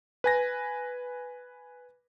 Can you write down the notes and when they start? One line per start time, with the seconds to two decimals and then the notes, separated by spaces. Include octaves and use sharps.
0.24 B4 G#5 A#6